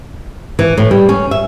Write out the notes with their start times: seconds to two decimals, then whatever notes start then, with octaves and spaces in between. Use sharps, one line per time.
0.59 E3
0.77 A2
0.91 G3
1.09 C#4
1.31 E5